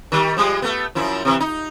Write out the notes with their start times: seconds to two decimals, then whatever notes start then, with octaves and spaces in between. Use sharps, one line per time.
0.12 D#3 G3
0.37 F3 G3 G#3
0.62 A3 B3
0.95 F#2 F3 E4
1.25 C3 E3
1.40 D#4